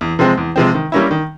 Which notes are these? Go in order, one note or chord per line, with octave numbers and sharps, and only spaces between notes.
E2
C3 F3 G#3 C4
E2
C3 F3 G#3 C4
D#3
G3 A#3 C#4 E4
D#3